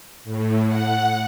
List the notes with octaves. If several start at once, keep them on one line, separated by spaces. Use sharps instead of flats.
A2
F#5